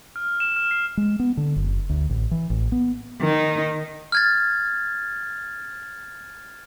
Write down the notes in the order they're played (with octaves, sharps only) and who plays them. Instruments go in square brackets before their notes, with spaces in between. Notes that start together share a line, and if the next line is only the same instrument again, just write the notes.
[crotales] F6
E7
F6
C7
[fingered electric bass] G#3
B3
D3
F#1
D2
A1
E3
A1
B3
[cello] D#3 D#4
[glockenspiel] F6 G#6 A6